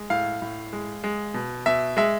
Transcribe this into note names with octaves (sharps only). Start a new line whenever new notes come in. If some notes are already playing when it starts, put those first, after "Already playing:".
Already playing: G#3
A2 F5
A2
G#3
G#3
B2
B2 E5
G#3 E5